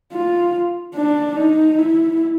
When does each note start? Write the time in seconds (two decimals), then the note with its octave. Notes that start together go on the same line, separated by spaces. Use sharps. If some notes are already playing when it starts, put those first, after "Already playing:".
0.12 F4
0.95 D4
1.36 D#4
1.78 E4